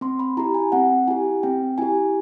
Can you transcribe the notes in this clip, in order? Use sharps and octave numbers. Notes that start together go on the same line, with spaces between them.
C4 C6
B5
E4 G4 A#5
G#5
C4 F#5
E4 G4 G#5
C4 G5
E4 G4 G#5